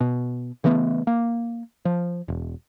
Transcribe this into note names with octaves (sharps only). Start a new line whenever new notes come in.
B2
C#3 E3 A3 B3
A#3
F3
E1